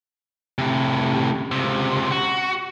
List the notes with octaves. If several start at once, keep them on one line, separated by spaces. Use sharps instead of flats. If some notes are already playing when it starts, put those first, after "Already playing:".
A2 C3
C#2 C3
F#4